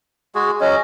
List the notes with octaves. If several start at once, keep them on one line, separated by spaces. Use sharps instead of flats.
G#3 F#4 G#4
F#3 C#4 D#5